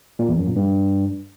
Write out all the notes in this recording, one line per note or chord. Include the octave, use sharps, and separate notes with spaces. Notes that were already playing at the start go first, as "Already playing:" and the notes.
A#2
E2
F#2
A#2
G2